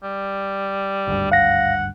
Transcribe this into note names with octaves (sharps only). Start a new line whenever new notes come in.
G3
G#1 D2 G2
F5 F#5 A#6